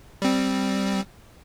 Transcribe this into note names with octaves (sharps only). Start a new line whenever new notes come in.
G3 C4